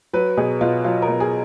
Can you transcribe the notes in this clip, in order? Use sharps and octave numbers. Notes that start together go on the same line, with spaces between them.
F#3 B4
B2 G#4
B2 F4
F#3 F4
A#4
B2
G#4